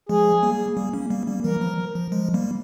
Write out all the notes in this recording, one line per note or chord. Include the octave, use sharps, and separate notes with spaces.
F3 G#3 G#4
G3 A#3
G3 A#3
A#3 C#4
G3 A#3
G3 A#3
E3 G3 A#4
F3
F3
F3 G#3
G3 A#3